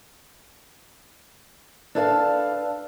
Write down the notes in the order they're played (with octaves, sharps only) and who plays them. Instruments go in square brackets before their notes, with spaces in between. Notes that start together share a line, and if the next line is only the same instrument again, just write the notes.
[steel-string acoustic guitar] D4 E4 A4 B4 F5 A5